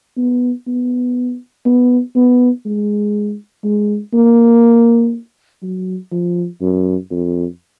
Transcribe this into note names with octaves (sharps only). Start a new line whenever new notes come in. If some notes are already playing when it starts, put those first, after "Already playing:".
B3
B3
B3
B3
G#3
G#3
A#3
F#3
F3
F#2
F2